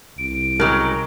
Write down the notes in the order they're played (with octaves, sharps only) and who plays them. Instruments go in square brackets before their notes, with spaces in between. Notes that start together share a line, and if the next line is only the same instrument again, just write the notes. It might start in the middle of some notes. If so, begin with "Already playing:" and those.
[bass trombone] C2 [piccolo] D7
[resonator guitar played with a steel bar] C#3 F#3 G#3 [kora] G4 A#4